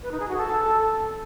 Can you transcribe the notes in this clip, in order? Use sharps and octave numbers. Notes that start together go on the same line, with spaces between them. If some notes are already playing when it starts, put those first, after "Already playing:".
B4
D#4
G#4
F#4
A4